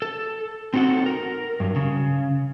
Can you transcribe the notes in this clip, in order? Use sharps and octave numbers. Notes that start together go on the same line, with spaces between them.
A4
C4 D#4 F#4 A4 F#5
A#4
G2 F#3
C#3